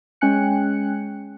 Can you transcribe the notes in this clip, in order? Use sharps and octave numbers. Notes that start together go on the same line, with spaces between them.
G#3 C#4 G5 G#5 F#6 C#7